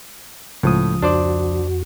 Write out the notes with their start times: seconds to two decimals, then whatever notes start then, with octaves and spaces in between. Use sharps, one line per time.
0.63 C#2 A2 F3 D#6
1.02 F2 D4 F#4 C5 D5